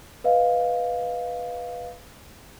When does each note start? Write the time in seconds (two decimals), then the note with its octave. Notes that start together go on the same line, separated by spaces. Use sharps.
0.24 B4 D#5 F5